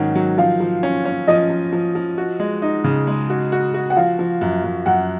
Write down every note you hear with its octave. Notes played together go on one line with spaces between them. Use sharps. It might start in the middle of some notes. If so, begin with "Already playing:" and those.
Already playing: G#2 D#3 F#3 C#4 F#5
F#3
F3 F5
F3
C#4
C#4
F3 D#5
F3
F3
F3
F#4
G#3
D#4
C#3
G#3
F#4
F#4
F#4
F#5
F3 F5
F3
F#2
F#2
F#2 F#5